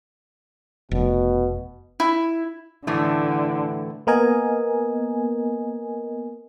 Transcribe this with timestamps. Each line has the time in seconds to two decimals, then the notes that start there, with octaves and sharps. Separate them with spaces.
0.91 F1 B2
2.00 E4
2.87 A2 D3 E3 A3
4.07 A#3 B3 A#4 D#5 G#5